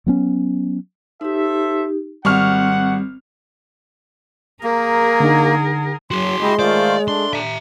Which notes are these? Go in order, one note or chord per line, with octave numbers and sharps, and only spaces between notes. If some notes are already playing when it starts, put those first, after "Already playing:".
F#3 B3 C#4
D#4 G4 A4 C5 E5
G#1 G3 C4 F#5 C#6 F6
A#3 G#4 A#4
D3 D#4
F#3 F#4 G#4 C6
G#3 E4 G4 D#5
D#3 A3 F4 C5 D5
A3 D4 C6
E5 A#5